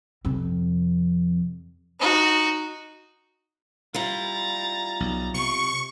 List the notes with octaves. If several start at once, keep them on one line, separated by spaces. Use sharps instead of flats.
F2 C3
D#4 F#4
G3 E4 F4 A#5 A6
B1
C3 C#6